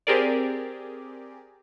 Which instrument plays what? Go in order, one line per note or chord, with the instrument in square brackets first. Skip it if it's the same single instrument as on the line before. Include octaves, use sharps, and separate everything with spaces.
[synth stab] C4 G4 G#4 A#4 D5